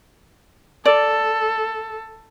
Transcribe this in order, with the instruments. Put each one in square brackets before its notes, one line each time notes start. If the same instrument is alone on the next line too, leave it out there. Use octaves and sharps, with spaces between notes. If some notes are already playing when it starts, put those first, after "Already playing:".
[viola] A4 [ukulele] D5